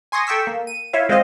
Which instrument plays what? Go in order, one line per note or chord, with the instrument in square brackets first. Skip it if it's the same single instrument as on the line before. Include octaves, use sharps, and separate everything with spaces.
[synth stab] G#5 C6 C#6 D#6 A#6
A4 G5 C#6 E6 B6
A#3
D#7
E4 F4 C#5 E5 F5
G#3 C4 F4 C5 D#5 F5